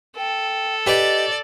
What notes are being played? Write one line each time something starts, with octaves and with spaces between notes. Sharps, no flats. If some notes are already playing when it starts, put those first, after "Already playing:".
A4 G5
G4 B4 D5 D#5 G5